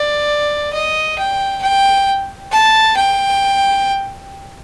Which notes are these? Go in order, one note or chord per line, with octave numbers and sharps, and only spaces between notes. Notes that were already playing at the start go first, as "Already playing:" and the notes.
Already playing: D5
D#5
G5
G5
A5
G5